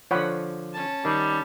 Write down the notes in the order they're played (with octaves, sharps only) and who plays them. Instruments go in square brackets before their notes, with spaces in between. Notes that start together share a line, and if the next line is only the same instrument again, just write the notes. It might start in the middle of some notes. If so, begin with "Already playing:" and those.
[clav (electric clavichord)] D3 F3 [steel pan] C#5 F#5 B5
[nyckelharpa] C#4 A5
[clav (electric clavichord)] D#3 [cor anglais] G3